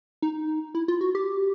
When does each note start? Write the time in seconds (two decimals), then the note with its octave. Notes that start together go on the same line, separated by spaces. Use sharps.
0.22 D#4
0.75 E4
0.88 F4
1.01 F#4
1.15 G4